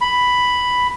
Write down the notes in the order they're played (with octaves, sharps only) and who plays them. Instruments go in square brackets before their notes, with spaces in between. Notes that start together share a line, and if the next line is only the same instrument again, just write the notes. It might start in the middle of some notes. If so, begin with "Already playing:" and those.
[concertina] B5